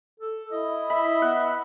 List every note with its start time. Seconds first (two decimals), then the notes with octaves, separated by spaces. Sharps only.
0.20 A4
0.52 E4 D#5
0.90 E5 B5
1.22 B3 F#5